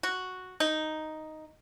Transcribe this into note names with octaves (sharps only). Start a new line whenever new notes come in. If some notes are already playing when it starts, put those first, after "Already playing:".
F#4
D#4